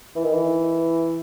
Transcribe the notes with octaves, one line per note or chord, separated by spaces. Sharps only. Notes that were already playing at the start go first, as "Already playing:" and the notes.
E3
D#3
E3